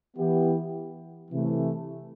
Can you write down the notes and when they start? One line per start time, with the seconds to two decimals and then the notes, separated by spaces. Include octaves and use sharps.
0.16 E3 B3 E4 G4
1.31 C3 E3 A3